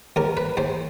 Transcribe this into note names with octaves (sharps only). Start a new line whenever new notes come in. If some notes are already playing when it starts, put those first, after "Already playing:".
D#2 A#4
B4
D#2 C5